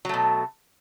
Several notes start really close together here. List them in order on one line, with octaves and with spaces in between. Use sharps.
F#3 A3 B2